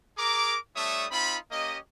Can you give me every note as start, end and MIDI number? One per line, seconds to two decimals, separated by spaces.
0.17 0.56 68
0.17 0.56 70
0.17 0.56 82
0.17 0.56 86
0.76 1.06 55
0.76 1.06 57
0.76 1.06 62
0.76 1.06 73
0.76 1.06 76
0.76 1.06 87
1.11 1.36 60
1.11 1.36 63
1.11 1.36 65
1.11 1.36 83
1.51 1.77 58
1.51 1.77 61
1.51 1.77 67
1.51 1.77 75